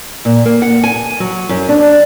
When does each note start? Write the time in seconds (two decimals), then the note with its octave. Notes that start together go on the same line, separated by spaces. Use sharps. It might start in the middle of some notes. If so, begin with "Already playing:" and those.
0.25 A#2
0.46 A#3
0.62 F#5
0.84 G#5
1.20 F#3
1.49 F#2
1.69 D4